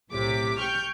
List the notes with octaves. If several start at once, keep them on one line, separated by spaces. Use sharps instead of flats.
B1 A2 C3 D6 B6
G5 C#6 F6 G6